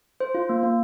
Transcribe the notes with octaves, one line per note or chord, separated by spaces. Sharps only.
C5
F4
A#3
A#3